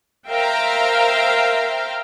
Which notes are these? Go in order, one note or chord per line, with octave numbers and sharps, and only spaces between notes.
A#4 C5 E5 F5 G5 A#5